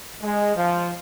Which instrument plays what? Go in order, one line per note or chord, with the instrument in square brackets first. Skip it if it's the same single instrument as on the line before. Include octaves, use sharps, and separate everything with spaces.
[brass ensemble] G#3
F3